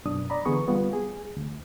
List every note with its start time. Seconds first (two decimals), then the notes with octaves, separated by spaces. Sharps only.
0.05 F#2 B2 D4 D#6
0.30 D5 A#5 B5
0.45 D3 E3 B3 G#4 C#6 D#6
0.68 G3 B3 F4
0.93 G#4
1.37 D2